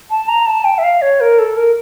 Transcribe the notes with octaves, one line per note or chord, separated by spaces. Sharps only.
A5
A#5
A5
G5
E5
F5
C#5
A#4
A4
A#4